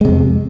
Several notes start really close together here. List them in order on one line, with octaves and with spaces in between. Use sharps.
G#3 C3 F2